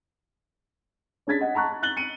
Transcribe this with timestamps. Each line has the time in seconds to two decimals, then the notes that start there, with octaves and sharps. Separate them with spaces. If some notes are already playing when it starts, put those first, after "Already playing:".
1.27 C#4 D4 G#4 G#6 A6 B6
1.41 D#5 F#5
1.55 A5 A#5 C#6 F#6
1.69 A#5
1.83 F#6 A6 F#7 G7
1.97 C#7 D#7